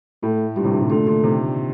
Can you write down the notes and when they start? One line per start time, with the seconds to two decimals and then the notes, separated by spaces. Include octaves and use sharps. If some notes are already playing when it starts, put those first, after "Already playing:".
0.23 A2 A3
0.56 G2 A#2 G3
0.65 A2 C3
0.73 A#2 D3
0.81 C3 D#3
0.90 A#2 D3 A3
1.07 A#2 D3
1.23 C3 D#3